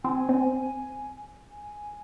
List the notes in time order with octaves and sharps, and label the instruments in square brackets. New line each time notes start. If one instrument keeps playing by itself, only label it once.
[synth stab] C4 [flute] G#5
[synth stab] C4
[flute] G#5